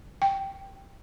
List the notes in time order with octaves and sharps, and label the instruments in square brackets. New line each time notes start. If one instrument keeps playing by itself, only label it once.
[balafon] G5